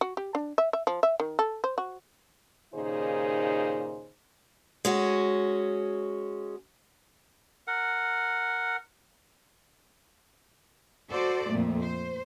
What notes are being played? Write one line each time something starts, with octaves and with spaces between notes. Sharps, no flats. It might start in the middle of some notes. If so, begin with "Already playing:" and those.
F#4
G4
D4
E5
E5
F3
E5
D#3
A4
C5
F#4
D#2 A#2 C#3 D#4 G#4 C5
G#3 C#4 F#4
A#4 F#5
F#4 A4 C5 D5
F2 A#2 A3
C5